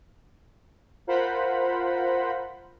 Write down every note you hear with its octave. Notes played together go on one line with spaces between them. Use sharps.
F4 A#4 C5 F#5 B5